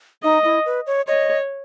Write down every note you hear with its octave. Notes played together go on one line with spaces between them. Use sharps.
D#4 D#5
E4
B4
C#5
C#5 D#5